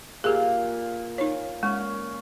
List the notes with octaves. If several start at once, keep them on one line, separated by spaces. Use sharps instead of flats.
A#2 G4 G#4 F5
D#4 C#5
G#3 C#4